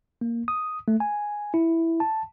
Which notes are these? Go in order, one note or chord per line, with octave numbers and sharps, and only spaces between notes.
A#3
D#6
A3
G#5
E4
A5